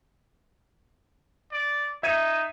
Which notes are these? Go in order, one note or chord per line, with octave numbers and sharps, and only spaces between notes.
D5
D#4 E5 G#6 D#7